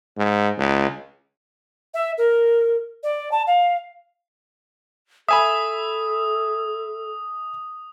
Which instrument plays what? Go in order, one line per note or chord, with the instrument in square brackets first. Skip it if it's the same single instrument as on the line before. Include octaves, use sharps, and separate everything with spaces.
[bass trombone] G#2
C#2
[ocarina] E5
A#4
D5
A5
F5
[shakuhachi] A4 [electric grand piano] E5 G#5 B5 [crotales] D#6